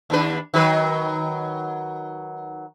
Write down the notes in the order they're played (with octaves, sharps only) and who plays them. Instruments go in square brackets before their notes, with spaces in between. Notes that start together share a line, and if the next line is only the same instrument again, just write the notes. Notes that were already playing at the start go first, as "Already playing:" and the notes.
[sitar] D#2 D4 B4
D#3 F#3 B4